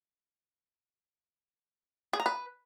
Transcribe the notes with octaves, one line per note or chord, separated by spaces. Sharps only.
G#4
A#5
B4